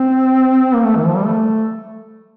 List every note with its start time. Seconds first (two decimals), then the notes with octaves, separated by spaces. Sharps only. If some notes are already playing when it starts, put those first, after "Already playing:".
Already playing: C4
0.75 A#3
0.85 A3
0.97 D#3
1.07 F3
1.17 G3
1.26 A3